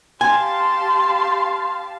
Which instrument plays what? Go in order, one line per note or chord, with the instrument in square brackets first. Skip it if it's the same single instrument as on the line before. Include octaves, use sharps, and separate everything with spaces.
[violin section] G4 F5 A5 [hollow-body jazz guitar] G#5 [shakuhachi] C6